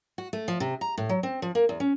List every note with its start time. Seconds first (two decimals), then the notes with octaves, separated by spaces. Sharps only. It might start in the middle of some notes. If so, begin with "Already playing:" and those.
0.18 F#4
0.33 A3
0.48 F3
0.60 C3
0.81 A#5
0.98 A2
1.09 F#3
1.23 C4
1.42 F3
1.55 A#3
1.69 E2
1.80 C#4